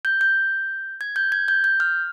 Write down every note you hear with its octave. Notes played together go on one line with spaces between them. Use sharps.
G6
G6
G#6
G6
G#6
G6
G6
F6